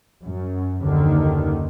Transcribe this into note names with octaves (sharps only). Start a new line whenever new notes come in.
F#2
F#1 D#2 D3 D#3